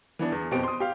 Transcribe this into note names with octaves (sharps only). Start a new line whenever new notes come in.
E3 B3 D4
E2
F2 B2 G4 C5 D7
C6 D#6
G4 F5